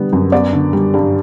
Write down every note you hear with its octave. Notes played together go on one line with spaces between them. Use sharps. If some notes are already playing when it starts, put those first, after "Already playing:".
Already playing: D3 G3 B3
F#2
B3 D5
D3
G3
G2